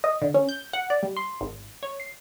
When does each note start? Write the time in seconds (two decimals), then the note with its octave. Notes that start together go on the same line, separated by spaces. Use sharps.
0.04 D#5
0.22 D3
0.34 C#4
0.49 G6
0.73 F#5
0.90 D5
1.03 G3
1.17 C6
1.41 G#1
1.83 C#5
2.00 C7